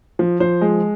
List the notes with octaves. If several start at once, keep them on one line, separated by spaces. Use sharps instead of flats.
F3
F3 C5
G#3